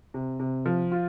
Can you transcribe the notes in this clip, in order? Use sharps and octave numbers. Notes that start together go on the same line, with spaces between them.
C3
C3
F3
F4